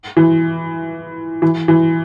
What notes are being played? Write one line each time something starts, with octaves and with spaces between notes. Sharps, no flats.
E3
E3
E3